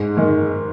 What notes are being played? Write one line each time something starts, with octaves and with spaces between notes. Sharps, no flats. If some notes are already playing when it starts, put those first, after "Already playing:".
Already playing: G#2
D#3 G#3